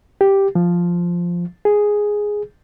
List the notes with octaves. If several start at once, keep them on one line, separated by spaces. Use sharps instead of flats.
G4
F3
G#4